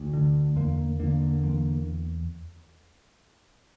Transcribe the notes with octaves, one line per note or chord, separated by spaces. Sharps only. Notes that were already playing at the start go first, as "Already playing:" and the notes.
Already playing: D2
D3
E2 A#3
D3 A#3
E2 A#3